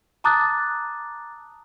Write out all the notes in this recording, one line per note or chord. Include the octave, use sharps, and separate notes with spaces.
A5 A#5 D6 D#6 F#6 A6